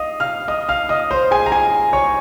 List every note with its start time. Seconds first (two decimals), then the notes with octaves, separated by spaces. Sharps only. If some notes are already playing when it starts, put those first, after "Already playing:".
Already playing: D#5 F5 D#6
0.20 F5 F6
0.48 D#5 D#6
0.69 F5 F6
0.89 D#5 D#6
1.11 C5 C6
1.31 G#4 G#5
1.46 A#5
1.52 G#4 G#5
1.93 C#5 C#6